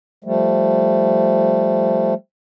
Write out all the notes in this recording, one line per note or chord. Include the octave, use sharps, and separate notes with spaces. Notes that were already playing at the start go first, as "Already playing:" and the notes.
F3 G3 A3